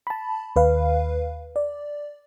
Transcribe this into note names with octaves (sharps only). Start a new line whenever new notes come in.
A5 B5
D#2 B4 F5
D5